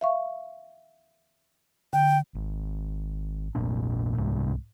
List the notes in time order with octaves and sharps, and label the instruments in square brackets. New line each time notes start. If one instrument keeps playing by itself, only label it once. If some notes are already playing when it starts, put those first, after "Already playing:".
[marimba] E5 F5 C#6
[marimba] D3 [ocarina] G5
[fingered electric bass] G#1
F1 A#1 A#2 D4
C2 G#2 C3 G#3